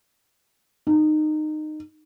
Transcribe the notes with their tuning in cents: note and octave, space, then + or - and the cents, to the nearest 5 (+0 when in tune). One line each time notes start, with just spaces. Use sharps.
D#4 -20